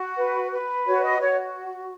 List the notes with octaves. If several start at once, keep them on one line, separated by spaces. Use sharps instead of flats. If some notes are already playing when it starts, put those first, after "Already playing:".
Already playing: F#4
B4
B4
F#4 C#5
D#5
F#4 C#5